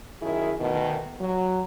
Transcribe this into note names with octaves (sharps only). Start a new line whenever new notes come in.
F#2 D#3 E4 G#4
D2 B2 D#3
F#3